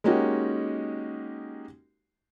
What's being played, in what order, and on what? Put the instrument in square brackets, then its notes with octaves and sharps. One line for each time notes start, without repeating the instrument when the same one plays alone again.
[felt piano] G#3 A#3 C#4 D#4 F#4 G4